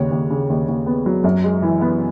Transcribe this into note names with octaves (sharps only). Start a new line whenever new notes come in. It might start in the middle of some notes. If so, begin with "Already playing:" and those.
Already playing: D#2 C#3 C#5
D#2
C#3
D#2
D#2
B3
F#3
F#2
G#3
E3
B3